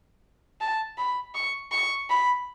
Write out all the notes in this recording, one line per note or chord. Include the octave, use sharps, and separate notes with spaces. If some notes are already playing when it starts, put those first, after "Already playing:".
A5
B5
C#6
C#6
B5